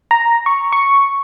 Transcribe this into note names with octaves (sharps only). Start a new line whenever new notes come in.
A#5
C#6
C#6